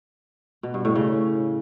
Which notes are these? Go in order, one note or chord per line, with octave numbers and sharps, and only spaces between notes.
B2
G2
A2
C#3